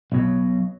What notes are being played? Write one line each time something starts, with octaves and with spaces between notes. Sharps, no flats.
B1 B2 F#3